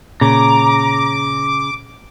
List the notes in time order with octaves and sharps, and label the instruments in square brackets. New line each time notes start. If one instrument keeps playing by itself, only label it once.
[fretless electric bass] A#2 [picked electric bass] C#3 [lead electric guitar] A#5 [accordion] D6